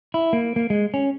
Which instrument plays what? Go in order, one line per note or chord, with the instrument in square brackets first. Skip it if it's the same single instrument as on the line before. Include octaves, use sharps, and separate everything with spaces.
[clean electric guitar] E4
A#3
A#3
G#3
C#4